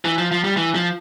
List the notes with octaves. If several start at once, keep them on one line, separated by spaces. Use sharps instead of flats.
E3
F3
F3
G3
E3
F3